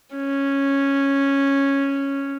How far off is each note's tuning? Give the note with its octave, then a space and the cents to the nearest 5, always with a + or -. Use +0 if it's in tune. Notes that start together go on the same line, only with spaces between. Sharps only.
C#4 -5